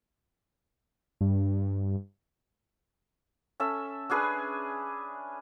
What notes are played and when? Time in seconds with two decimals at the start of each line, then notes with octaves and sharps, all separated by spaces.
1.21 G2
3.60 C#4 A4 E5
4.10 C#4 D4 G#4 B4